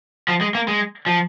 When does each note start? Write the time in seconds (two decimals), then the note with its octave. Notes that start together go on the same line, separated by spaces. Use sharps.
0.28 F3
0.41 G#3
0.55 A#3
0.68 G#3
1.06 F3